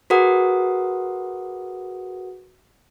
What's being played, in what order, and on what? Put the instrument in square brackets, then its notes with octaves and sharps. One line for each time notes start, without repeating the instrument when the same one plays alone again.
[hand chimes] F#4 G#4 A#4 B4 F#5 D#6